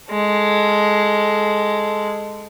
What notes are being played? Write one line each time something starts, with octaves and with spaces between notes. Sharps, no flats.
G#3 A4